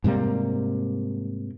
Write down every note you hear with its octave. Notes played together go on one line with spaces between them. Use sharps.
G#2 C3 G3 A#3